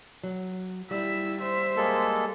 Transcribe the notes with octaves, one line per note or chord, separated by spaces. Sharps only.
F#3
G3 E4 E5
C5 E5
G#3 A#3 A4